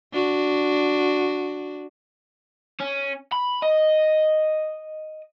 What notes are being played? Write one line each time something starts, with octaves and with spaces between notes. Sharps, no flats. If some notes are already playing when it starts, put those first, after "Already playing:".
D4 F#4
C#4
B5
D#5